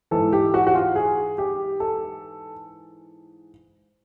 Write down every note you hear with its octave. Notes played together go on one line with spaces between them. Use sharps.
G#2 E3 A4
G4
F#4
F#4
F4
G#4
G4
A4